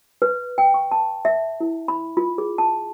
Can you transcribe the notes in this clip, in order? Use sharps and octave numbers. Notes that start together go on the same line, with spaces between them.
B4
G5
C#6
A5
E5
E4
B5
F4
G#4
A5